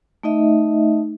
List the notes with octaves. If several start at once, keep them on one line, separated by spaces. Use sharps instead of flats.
A3 D#4 D#5 E5